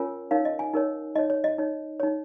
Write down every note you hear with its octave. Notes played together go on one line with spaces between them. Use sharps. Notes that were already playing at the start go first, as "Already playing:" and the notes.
Already playing: C#4 F4 A#4 C#5 G#5
D#4 A#4 C#5 F5
D#5
G#5
D#4 A#4 C#5
D#4 C#5 D#5
C#5
D#5
D#4 C#5
D#4 C#5